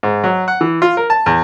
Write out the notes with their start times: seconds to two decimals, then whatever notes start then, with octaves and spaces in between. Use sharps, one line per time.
0.03 G#2
0.24 F#3
0.48 F#5
0.61 E3
0.82 F4
0.97 A#4
1.10 A5
1.26 E2